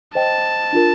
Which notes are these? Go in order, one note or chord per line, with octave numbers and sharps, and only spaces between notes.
C5 D#5 G5 A5
D4 F4 A#4